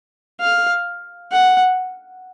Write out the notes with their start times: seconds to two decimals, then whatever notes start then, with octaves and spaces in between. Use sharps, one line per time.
0.41 F5
1.32 F#5